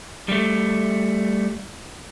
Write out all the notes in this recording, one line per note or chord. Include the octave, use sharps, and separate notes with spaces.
G3 A3